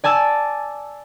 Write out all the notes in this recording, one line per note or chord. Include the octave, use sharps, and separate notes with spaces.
D5 G#5 A5 E6